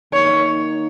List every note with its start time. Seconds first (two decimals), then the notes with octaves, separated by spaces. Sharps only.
0.12 D#3 A#3 D#4 C#5